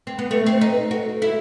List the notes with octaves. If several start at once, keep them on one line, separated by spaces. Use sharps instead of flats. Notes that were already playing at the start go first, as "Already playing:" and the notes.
C4
B3
A3 B4
C4 C5
D#4
B4
F#4 A4
E4 A4